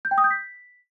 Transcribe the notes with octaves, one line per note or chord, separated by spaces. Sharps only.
G6
G5
D#6
G6
B6